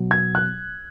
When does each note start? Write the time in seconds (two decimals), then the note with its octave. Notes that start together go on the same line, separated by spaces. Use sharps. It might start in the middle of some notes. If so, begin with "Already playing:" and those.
Already playing: B2 F#3
0.11 G#6
0.35 F#6